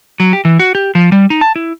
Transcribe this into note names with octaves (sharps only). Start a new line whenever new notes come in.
F#3
G4
E3
F#4
G4
F3
G3
D#4
A5
E4